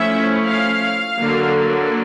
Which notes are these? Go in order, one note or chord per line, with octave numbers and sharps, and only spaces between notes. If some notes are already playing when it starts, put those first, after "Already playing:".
Already playing: F3 A3 C#4 E4 E5
F5
D3 F#3 A#3